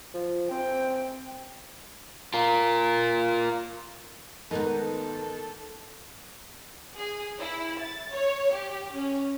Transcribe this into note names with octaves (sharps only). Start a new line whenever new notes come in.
F3
C4 G5
F4 A#4
G#2 D#3 B3 D#4 A4
G#4
E4
A6
C#5
G4
C#4